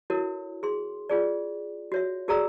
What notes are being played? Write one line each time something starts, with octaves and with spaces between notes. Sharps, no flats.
E4 F#4 A4 A#4 C#5
G#4 C6
F4 G#4 D5
F#4 C#5 E5
F#4 G#4 A4 D5 A#5 E6